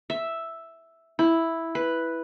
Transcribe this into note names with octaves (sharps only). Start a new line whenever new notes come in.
E5
E4
B4